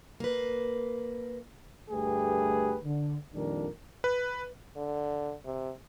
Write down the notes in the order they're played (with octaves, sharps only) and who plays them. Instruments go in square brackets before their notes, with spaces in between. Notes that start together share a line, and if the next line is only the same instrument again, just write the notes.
[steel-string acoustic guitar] A#3 B4
[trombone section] D2 G2 A3 G4 G#4 B4
D3
F2 A#2 D#3 G3 D4 A#4
[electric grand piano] B4
[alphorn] D3
C3